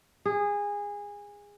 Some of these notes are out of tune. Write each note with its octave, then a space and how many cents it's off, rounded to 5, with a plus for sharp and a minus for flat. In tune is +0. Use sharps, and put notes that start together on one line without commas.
G#4 -20